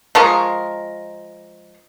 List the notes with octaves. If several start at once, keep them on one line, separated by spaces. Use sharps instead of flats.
F3 G#3 A#4 C#6